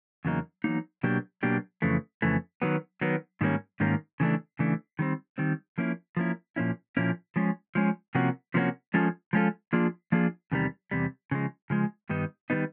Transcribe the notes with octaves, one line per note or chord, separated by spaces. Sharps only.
E2 C#3 F#3 A#3 D#4
E2 C#3 F#3 A#3 D#4
B2 F#3 A#3 D4 G4
B2 F#3 A#3 D4 G4
F2 C#3 E3 A3
F2 C#3 E3 A3
D#3 F#3 B3
D#3 F#3 B3
G#2 D#3 G3 A#3 C#4
G#2 D#3 G3 A#3 C#4
C#3 E3 A3 D4
C#3 E3 A3 D4
D#3 G3 C4
D#3 G3 C4
F3 A#3 C#4 E4
F3 A#3 C#4 E4
A#2 F3 A#3 C#4 E4
A#2 F3 A#3 C#4 E4
F3 G#3 C#4
F3 G#3 C#4
C3 F3 A#3 C#4 F#4
C3 F3 A#3 C#4 F#4
F3 G#3 C#4 F4 A4
F3 G#3 C#4 F4 A4
F3 A#3 D4 F4 G#4
F3 A#3 D4 F4 G#4
E2 C3 D#3 G3
E2 C3 G3
C#3 F3 G#3
C#3 F3 G#3
G2 D#3 G3 B3 D#4
D#3 G3 B3 D#4